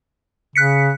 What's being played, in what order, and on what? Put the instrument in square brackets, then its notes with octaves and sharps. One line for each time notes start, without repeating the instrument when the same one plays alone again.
[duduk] C#3 [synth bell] F#6 B6 C#7